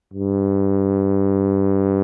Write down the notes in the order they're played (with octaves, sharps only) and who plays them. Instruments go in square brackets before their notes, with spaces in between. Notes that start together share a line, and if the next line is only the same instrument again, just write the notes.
[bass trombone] G2